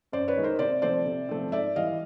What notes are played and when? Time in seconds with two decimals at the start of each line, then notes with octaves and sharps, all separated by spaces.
0.12 F#2 C5 D5
0.28 B4 C#5
0.36 D#3 G#3
0.43 A#4 C5
0.59 C3 C5 D5
0.82 F3 A3 C4 C5 D5
1.05 C3
1.29 F3 A3 C4
1.52 G#2 D5 E5
1.76 E3 G3 D#5 F5